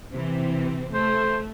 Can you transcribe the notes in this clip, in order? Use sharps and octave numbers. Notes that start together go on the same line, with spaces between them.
C3 E3 C4
A3 C5